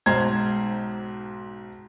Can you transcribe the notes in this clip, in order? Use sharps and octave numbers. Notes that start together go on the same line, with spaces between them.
B1 G#2 C5 A#5 C6 G#6